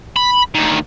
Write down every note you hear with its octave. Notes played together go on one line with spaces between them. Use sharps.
B5
D2 D#3